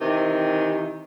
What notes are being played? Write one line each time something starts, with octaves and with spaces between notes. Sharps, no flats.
C3 D#3 E3